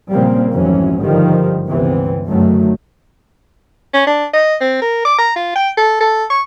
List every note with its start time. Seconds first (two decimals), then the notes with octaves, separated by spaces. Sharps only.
0.11 A#2 C#3 F3 G3 A#3 C4
0.51 G#1 F2 E3 F#3 C#4
1.00 G2 D3 D#3 F3 G3
1.66 G1 C#2 C3 E3 B3 C4
2.26 F#2 D3 D#3 F#3 A3
3.94 C#4
4.07 D4
4.33 D#5
4.61 C4
4.81 A#4
5.05 D6
5.18 A#5
5.36 F4
5.56 G5
5.77 A4
6.00 A4
6.30 C#6